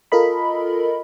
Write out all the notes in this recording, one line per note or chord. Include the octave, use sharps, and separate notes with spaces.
F4 A4 A#4 D#5 B5